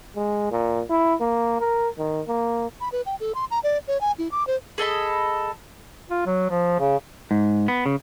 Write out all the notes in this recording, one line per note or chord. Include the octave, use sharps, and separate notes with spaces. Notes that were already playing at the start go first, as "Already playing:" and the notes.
G#3
A#2
E4
A#3
A#4
D#3
A#3
B5
B4
G5
A4
C6
A#5
D5
C#5
G#5
E4
D6
C5
G#4 A4 D#5 B5
F4
F#3
F3
C#3
G#2
B3
C#3